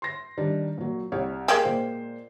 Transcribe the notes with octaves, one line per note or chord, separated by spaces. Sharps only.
C6 A#6
D#3 G3 D4
A#2 F#3
C2 G4 C#5
G#3 A#3 G4
A#2 C5